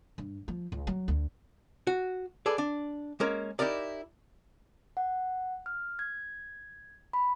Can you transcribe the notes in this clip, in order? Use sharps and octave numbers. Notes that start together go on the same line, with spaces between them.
G2
F3
C#2
F#3
D2
F#4
G#4 A4 B4 D5
D4
G#3 A#3 C#4 A#4
D#4 E4 G4 A#4 D5
F#5
F6
G#6
B5